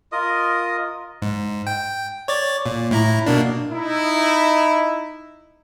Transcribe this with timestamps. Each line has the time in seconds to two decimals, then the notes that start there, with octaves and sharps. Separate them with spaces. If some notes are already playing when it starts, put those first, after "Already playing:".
0.12 F4 A#4 D#5 D#6
1.22 G#2
1.67 G5
2.28 C#5 D5 A6
2.66 A#2
2.91 A2 E4 A#5
3.26 B2 A#3 D4
3.71 D#4 E4